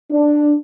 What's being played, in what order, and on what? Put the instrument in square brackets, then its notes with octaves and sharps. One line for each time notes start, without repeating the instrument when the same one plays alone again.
[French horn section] D4